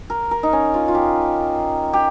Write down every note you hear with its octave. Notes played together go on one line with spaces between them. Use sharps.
A#4
A#4
D#4
C#4
F4
F4
G4
G4